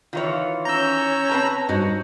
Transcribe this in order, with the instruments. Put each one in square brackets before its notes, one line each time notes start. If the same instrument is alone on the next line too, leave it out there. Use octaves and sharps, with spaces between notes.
[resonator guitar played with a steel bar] D#3 E3 C#5 [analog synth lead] F4
[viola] C#4 [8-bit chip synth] A#5 E6 [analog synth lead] G6
[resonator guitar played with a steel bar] C4 B4 A5
[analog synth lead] G2 [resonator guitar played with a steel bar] D#4 F#4 C5